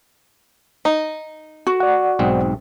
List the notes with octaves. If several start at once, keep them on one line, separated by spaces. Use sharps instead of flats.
D#4
F#4
D5 F#5
B1 G#2 C4